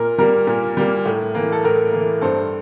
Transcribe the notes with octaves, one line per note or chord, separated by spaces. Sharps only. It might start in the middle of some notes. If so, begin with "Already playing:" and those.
Already playing: A#2 A#4
G3 A#3 A#4
A#2
G3 A#3
A2
E3 A#3
A4
A2 A#4
E3 A#3
G2 A4 C5